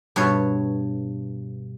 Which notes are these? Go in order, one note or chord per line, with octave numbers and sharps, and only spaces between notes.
G2 B2 C#5